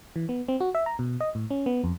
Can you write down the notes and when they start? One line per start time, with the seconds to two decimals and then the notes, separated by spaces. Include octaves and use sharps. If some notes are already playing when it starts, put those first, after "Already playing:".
0.16 E3
0.29 B3
0.48 C4
0.61 F#4
0.75 E5
0.86 A#5
0.99 B2
1.21 D#5
1.35 A2
1.51 C#4
1.66 B3
1.84 F2